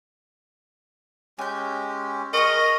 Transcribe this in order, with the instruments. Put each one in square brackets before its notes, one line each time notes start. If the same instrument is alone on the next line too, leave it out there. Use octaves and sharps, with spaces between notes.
[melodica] G#3 C#4 G4 [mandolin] G#5 G6
[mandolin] G#4 A#5 C#6 [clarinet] A#4 [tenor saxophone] D#5